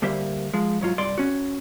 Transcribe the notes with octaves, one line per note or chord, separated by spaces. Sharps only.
D2 G3 A#3 G4 C5 E5
F3 G#3
G#2 F#3 F4
C2 G2 D5 C6
C#4 F#4